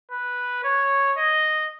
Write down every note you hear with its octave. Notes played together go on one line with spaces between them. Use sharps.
B4
C#5
D#5